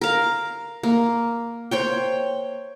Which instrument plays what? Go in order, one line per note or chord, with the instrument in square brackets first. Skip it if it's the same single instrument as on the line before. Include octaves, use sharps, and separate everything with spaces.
[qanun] A#4 F5
A#3
C5 C#5 G5